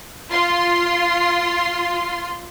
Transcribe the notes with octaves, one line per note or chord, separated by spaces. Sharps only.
F4 C6